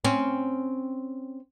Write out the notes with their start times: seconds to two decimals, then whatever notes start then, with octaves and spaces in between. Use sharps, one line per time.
0.04 C4 C#4